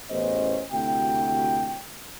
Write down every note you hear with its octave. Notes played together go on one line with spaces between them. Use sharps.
A1 E2 B3 C#4 C5 D#5
D2 C3 E4 F#4 G5